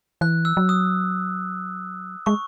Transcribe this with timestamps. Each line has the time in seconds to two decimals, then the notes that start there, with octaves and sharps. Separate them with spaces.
0.21 E3 F#6
0.45 E6
0.57 F#3
0.69 D#6
2.26 G#3 C#6